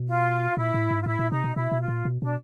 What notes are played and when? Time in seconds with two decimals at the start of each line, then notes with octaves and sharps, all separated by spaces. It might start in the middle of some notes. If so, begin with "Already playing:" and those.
Already playing: B2
0.08 F4
0.57 A#2 E4
0.74 A2
0.91 G#2
1.01 F4
1.06 A2 E4
1.19 A#2
1.31 C3 D#4
1.44 B2
1.55 B2 E4
1.72 B2
1.81 F4
1.88 A#2
2.05 B2
2.21 B2 D4